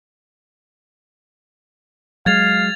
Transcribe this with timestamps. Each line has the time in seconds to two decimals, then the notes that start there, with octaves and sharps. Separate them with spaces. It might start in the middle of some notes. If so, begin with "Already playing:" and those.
2.26 F#3 G#3 F5 G#6 A6 F7